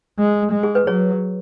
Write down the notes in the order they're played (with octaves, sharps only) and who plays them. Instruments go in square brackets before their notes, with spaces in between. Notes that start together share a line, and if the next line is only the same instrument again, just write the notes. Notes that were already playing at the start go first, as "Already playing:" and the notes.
[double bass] G#3
G#3
[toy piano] G#4
B4
[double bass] F#3 [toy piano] G#4 C#5